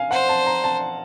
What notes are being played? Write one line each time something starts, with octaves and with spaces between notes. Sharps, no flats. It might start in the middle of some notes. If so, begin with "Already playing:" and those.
Already playing: F5 G#5
C5 F#5
A5
A#5
A5